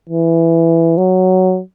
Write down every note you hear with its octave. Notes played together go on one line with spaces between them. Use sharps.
E3
F#3